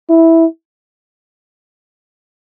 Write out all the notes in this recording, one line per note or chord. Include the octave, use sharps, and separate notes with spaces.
E4